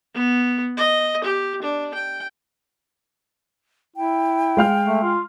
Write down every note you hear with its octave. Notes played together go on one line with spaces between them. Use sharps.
B3
D#5
G4
D4
G5
E4 G5
G#3 F5 F6
A3
F4